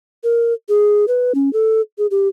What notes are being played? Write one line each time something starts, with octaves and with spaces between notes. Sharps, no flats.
A#4
G#4
B4
C#4
A4
G#4
G4